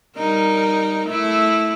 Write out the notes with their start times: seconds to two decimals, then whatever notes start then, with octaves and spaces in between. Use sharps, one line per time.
0.17 G3 D#4 A#4
1.06 A3 E4